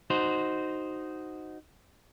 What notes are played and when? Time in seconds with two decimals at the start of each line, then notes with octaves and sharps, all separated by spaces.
0.10 D#4 F#4 C5